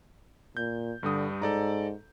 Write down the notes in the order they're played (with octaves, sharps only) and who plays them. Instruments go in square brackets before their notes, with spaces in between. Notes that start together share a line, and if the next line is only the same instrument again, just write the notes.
[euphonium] A#2 [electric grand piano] G6
[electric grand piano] G2 G3 D#6 [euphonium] D3
[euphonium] G#2 [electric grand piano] A4 D5 A#5